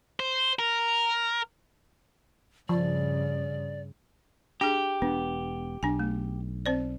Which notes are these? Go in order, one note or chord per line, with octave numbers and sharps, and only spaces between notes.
C5
A#4
G2 C#3 F3 D5
D4 G4 G#4
E1 B3 D4
B1 D4 G#5
A3
C4 C5 D5